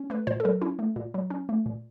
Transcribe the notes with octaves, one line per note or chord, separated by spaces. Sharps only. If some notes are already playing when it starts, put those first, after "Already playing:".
Already playing: C#4
A3 B4
A#2 C5
A4
F#3 A#4
C#4 E4
A3
A#2
F#3
C#4
A3
A#2